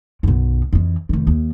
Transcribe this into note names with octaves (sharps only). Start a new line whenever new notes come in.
B1 F#2
F2 E3
F1 D#3
D#2